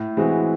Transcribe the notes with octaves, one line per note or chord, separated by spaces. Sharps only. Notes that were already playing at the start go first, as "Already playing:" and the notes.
Already playing: A2
E3 G#3 C4 F#4